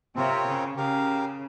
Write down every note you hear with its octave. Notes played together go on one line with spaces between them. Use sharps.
C3 C4 F4 A#4 C#5
C#3
C#3 G4 A#4 F5